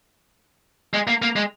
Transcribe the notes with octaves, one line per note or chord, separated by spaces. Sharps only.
G#3
A#3
A#3
G#3